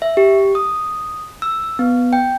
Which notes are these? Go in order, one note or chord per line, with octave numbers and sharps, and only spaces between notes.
E5
G4
D#6
E6
B3
G5